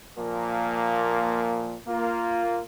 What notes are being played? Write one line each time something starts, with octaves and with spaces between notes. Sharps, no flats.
A#2 F3 A#3
A#3 F4